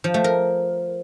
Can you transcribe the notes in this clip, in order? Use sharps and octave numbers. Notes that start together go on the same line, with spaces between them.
F3
A3
A#4